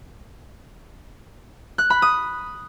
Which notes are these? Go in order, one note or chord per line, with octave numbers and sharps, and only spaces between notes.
F#6
B5
D#6